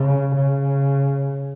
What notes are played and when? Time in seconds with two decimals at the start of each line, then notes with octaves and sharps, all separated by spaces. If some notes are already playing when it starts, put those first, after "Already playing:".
Already playing: C#3
0.35 C#3